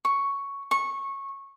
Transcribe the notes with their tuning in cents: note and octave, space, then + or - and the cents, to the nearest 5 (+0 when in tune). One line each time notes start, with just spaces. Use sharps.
C#6 +5
C#6 -15